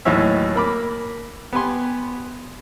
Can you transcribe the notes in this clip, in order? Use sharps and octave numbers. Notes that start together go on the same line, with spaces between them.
D#2 A2 E3 F#3 C#5 E5
A#3 B5 D6
B3 G4 G#5 C6